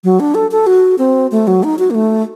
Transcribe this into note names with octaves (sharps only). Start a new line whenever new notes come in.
F#3
D4
A4
A4
F#4
C4
A3
F#3
D#4
F#4
A#3
A3